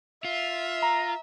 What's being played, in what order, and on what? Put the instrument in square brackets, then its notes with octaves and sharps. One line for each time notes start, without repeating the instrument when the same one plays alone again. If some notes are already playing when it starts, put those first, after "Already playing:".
[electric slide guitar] F4 [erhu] E5
[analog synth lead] A#5